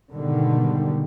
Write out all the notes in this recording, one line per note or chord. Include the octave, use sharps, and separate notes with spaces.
G#2 B2 D3 D#3 G3